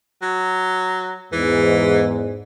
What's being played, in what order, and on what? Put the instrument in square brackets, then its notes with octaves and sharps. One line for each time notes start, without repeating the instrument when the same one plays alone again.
[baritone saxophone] F#3
[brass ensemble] E2 G#2 [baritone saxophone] E3